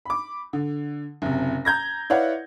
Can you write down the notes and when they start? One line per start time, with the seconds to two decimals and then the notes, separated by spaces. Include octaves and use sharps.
0.05 B5 D6
0.53 D3
1.22 F#1 C3
1.65 A#5 G6 G#6 A#6
2.10 E4 B4 C#5 D5 F5 F#5